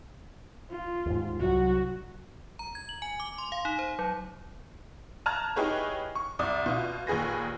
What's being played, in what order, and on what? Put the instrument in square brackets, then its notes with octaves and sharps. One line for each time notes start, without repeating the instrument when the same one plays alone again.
[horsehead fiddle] F4
[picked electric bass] D#2 G#2
[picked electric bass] C2 F#3 [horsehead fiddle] F#4
[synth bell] A#5
G#6
F#7
G#5
D6
C6
F5
D#4
C5
F#3
[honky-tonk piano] A5 A#5 F6 F#6 G#6
D#4 E4 G4 G#4 B4 C#5
C#6
C2 D5 D#6
B2 F4
D#2 A#2 G#4 B4 A#6